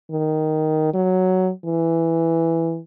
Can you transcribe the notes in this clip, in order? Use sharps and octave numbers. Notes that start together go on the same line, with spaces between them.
D#3
F#3
E3